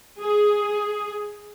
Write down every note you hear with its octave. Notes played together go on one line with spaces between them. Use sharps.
G#4